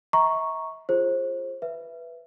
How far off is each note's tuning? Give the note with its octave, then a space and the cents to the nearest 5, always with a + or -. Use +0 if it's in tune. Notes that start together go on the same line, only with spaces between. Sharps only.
E5 -40 A#5 +5 C#6 +0
F4 -10 G#4 +0 C5 +25
B4 -5 E5 +15